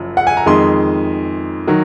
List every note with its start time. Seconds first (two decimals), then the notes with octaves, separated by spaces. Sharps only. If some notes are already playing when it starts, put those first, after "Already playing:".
Already playing: F#1 F#2 F3
0.17 F#5
0.27 G#5
0.37 A#5
0.46 F2 D#3 G#3 C6
1.67 D#3 F#3